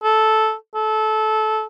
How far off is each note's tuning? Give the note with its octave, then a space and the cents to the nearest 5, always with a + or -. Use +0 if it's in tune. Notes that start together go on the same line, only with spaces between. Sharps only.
A4 -10
A4 -20